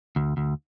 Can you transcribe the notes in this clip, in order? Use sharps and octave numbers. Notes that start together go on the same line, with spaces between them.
D2
D2